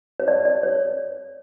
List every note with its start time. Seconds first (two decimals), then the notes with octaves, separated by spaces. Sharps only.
0.20 C#5
0.28 D5
0.45 D5
0.63 C#5